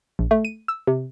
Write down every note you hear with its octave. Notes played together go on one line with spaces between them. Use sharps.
A#1
A3
D#7
E6
C3